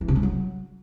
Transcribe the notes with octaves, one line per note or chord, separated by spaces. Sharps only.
E3
C3
G#3
F#3